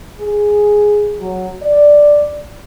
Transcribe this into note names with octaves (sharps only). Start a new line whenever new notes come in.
G#4
F#3
D5